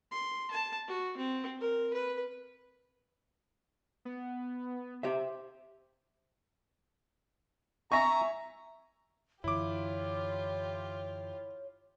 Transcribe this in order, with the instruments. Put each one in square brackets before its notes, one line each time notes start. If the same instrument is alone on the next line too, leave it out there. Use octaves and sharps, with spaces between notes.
[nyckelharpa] C6
A5
F#4
C4
A#4
B4
[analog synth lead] B3
[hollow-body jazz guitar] G4 C5 E5
[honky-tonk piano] E5 G#5 C#6 [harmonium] A#5
[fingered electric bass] F#2 D3 E3 [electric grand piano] E4 D6 [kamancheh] F4 G4 [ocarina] C#5